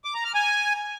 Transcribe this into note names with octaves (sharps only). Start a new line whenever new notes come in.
D6
A#5
F6
G#5